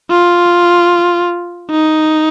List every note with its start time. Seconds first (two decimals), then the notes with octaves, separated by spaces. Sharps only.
0.10 F4
1.71 D#4